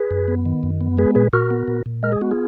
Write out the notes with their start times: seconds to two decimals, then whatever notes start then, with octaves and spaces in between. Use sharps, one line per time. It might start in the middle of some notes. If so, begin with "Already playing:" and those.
Already playing: G#4 B4
0.11 F#2
0.28 B3
0.45 D#3
0.63 F#2
0.81 B3
0.97 G#3 G#4 B4
1.15 A#2 G#4 B4
1.33 A#2 F#4 A#4
1.51 B3
1.68 A#2
1.86 A#2
2.03 G#3 A#4
2.12 G#4
2.21 B3 F#4
2.31 F4 G#4